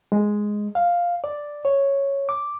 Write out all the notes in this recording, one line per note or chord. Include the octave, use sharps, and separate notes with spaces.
G#3
F5
D5
C#5
D6